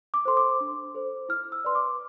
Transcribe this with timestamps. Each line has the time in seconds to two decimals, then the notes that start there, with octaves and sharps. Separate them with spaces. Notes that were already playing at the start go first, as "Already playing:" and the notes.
0.14 D6
0.25 A4 C5 C6
0.37 D6
0.60 D4
0.94 A4 C5
1.29 E4 F6
1.52 E6
1.65 B4 D5 C6
1.75 D6